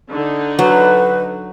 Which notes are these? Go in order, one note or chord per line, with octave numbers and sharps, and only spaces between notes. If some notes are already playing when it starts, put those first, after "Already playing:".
D3 D#4
F#3 B4